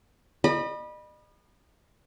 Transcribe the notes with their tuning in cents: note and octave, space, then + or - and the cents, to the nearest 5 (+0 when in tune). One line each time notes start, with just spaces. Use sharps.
D#5 -40 B5 -20